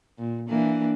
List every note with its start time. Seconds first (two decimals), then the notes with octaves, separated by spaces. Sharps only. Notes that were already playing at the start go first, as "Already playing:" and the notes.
0.18 A#2
0.48 E3 A#3 D4